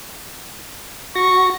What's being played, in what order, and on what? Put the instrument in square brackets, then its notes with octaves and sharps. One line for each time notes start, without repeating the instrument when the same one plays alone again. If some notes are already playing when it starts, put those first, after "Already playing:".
[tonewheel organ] F#4 A#6 [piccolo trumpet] C#6